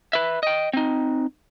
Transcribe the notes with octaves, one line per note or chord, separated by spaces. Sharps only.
B4 E5
D#5 G5
C4 D#4